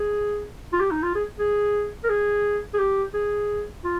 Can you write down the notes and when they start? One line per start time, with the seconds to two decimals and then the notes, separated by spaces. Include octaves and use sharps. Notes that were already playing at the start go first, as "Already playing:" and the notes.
Already playing: G#4
0.73 F4
0.80 G4
0.91 D#4
1.03 F4
1.15 G#4
1.39 G#4
2.04 A#4
2.09 G#4
2.73 G#4
2.79 G4
3.14 G#4
3.84 F4